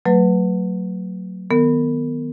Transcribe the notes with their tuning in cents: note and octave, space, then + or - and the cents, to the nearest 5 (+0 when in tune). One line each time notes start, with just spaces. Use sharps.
F#3 +0 A3 +40 B4 +0
D#3 +5 B3 +0 A#4 -35